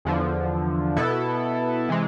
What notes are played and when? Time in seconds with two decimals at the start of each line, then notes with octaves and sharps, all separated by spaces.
0.05 E2 D3 F3
0.97 B2 B3 E4 A4
1.89 C3 E3 G#3